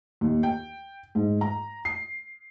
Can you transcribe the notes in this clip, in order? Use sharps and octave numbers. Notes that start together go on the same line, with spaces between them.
D#2
G5
G#2
A#5
C7